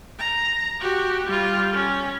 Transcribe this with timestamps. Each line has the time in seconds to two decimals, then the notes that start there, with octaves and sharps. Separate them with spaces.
0.18 A#5
0.80 F#4 G4
1.27 G3 F4
1.73 C#4